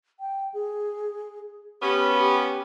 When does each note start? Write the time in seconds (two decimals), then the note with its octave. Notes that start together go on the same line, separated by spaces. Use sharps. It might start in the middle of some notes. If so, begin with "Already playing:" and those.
0.20 G5
0.54 G#4
1.82 B3 C#4 G4
2.17 G4